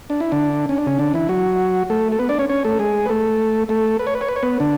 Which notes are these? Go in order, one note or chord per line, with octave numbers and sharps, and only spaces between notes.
D4
E4
D3 D4
C#4
D4
C#3 C#4
D3 D4
E3 E4
F#3 F#4
A3 A4
A4
B3 B4
D4 D5
C#4 C#5
C#4 C#5
A3 A4
G#3 G#4
B4
A3 A4
A3 A4
B4
C#5
B4
C#5
B4
C#5
B3 B4
D3 D4